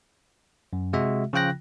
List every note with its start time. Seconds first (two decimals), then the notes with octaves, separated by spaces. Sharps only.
0.73 F#2
0.93 C3 G#3 F#4 E5
1.33 C#3 F3 F4 G5 F#6 A#6